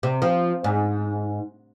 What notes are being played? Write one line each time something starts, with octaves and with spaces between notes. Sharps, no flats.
C3
F3
G#2